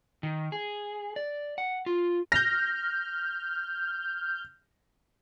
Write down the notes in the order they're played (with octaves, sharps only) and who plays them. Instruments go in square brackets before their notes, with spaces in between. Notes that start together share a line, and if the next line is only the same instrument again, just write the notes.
[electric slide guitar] D#3
G#4
D5
F#5
F4
[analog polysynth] F6 G6 [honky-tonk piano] A#6